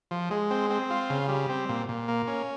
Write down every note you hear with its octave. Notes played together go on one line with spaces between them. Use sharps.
F3
G#3
C4
C4
F4
C#3
G3
C4
A#2
A#2
A#3
C#4